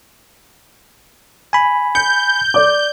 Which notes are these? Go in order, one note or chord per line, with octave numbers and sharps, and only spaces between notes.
G#5 B5
G6 C#7
D5 D6